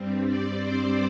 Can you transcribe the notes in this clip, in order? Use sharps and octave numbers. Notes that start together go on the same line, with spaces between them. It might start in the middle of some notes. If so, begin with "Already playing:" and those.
Already playing: G2 G3 C4
D5
C5